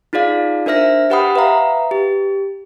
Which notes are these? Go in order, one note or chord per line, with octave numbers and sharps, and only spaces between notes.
D#4 F4 G#4 D5 F5
D4 A#4 C5 E5 F6 A#6
G4 B4 F#5 G5 B5 D#6
B4 E5 F5 A#5
G4